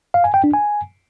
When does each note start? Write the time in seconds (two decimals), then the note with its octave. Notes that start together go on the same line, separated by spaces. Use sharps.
0.14 F5
0.24 G#5
0.34 G5
0.44 D4
0.53 G#5